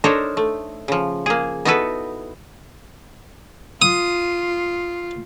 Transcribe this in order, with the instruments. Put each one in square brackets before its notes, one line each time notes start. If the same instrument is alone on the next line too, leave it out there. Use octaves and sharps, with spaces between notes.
[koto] D4 D#4 A4 A#4 C5 C#5
A3
C#3 F3
A#3 G#4
B3 D#4 E4 F#4 A4 B4
[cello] F4 [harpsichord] D#6